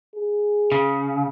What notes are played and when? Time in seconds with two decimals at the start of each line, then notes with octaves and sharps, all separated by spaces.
0.16 G#4
0.72 C#3